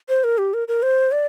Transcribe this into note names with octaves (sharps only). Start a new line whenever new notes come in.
C5
A#4
G4
A#4
A#4
C5
D5